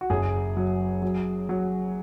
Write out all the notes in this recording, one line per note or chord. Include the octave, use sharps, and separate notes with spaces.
F#4
F#1 G#4
F#3
F#3
F#3